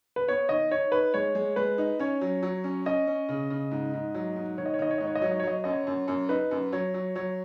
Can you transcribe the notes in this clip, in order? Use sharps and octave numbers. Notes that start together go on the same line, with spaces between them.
B4
B3 C#5
D#3 D#5
D#4 C#5
D#4 B4
G#3 C#5
G#3
G#3 B4
D#4
C#4 C#5
F#3
F#3
C#4
C#4 D#5
C#4
C#3
C#3
G#2
G#2
F#3
G#2
D#3 C#5
D#5
C#5
D#3 D#5
C#5
G#2 D#5
C#5
D#5
F#3 C#5
D#5
C#5
F#3 D#5
C#5
F#2 D#5
C#5
F#2
F#2
D#4 B4
F#2
F#3 C#5
F#3
F#3 C#5